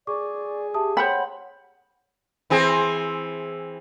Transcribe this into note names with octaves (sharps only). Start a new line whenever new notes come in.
G#4 D5 C#6 D6
G4 E5 A5 D#6
C5 C#5 F#5 G5 B5 C6 F#7
E3 C4 G#4